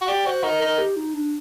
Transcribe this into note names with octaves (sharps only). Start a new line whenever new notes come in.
F#4
G4 D5
F#4 C5
D#4 A#4
D#4 A#4
G4
D#4
D4